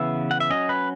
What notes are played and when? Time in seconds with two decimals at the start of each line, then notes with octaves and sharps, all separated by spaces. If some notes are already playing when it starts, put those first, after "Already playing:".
Already playing: C#3 E3 B3 E5
0.31 F#5
0.40 E5
0.50 F#3 C#4 D#5
0.69 B4